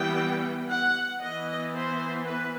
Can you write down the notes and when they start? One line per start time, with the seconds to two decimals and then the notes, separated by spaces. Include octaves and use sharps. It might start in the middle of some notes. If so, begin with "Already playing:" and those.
Already playing: E3 G3 B3 G5
0.71 F#5
1.22 E3 B3 D#5
1.73 C5
2.25 B4